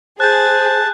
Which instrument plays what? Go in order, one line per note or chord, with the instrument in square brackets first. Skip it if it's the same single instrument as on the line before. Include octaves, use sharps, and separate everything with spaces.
[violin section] G#4 [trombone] C5 [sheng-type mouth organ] A5 [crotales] F#6 G6